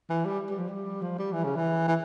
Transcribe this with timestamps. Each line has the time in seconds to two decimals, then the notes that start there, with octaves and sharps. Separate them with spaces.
0.09 E3
0.25 G3
0.50 G3
0.59 F3
0.68 G3
1.02 F3
1.18 G3
1.33 E3
1.44 C#3
1.55 E3
1.88 E3